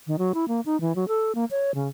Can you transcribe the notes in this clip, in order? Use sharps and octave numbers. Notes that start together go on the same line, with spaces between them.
D#3
F#3
E4
A#3
D#4
E3
F#3
A4
A#3
C#5
C#3